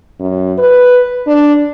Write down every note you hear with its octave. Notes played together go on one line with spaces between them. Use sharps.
F#2
B4
D4